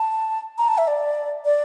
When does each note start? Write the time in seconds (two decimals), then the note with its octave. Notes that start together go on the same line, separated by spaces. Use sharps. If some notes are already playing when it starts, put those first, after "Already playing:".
Already playing: A5
0.58 A#5
0.68 A5
0.78 E5
0.87 D5
1.45 D5